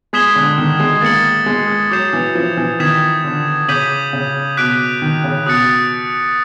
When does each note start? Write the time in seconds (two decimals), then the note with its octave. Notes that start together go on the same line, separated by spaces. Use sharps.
0.13 G#3 D#6 G#6 B6 E7 G7
0.35 D3
0.58 D#3
0.80 G#3
1.01 A#3 A6 C#7 F#7
1.46 G#3
1.91 F#3 D6 G6 C7 E7
2.13 E3
2.35 F3
2.57 E3
2.80 D#3 D#6 G#6 B6 E7
3.24 D3
3.68 C#3 D6 G6 B6 D#7 F#7
4.13 C#3
4.57 B2 D6 F#6 B6 D7
5.02 D#3
5.24 C#3
5.46 B2 D#6 F#6 A6 C#7